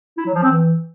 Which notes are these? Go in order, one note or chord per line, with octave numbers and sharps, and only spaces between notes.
E4
F#3
F3
C4
E3